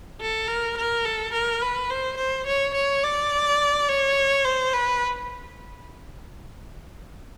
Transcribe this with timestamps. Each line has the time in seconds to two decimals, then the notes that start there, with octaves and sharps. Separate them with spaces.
0.21 A4
0.48 A#4
0.77 A#4
1.05 A4
1.33 A#4
1.62 B4
1.90 C5
2.18 C5
2.47 C#5
2.74 C#5
3.03 D5
3.89 C#5
4.45 C5
4.73 B4